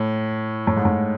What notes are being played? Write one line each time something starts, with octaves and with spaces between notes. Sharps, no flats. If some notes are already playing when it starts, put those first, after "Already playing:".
Already playing: A2
A2
G#2
A2